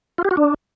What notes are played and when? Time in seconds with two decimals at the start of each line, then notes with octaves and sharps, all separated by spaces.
0.18 F4
0.25 G4
0.31 F#4
0.37 D4